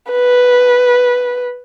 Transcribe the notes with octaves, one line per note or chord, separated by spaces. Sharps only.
B4